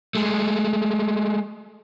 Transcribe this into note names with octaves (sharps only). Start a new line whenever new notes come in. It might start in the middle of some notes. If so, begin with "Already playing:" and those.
G#3 A3